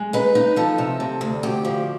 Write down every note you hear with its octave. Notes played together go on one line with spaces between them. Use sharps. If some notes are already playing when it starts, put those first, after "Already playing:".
Already playing: G#3
D#4 B4
D#4
F3 A4
C3
C3
D2
D2 G4
F3